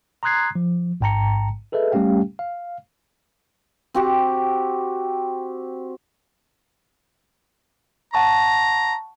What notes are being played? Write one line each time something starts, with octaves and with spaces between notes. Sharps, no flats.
A#5 C6 D#6 F#6 G#6 C7
F3
A1 G#2 G5 A5 A#5 C#7
G#4 A4 B4 D#5 E5
G3 A3 C#4 G4 F5 G5
F5
C4 F#4 G4
F#5 A5 A#5 C#6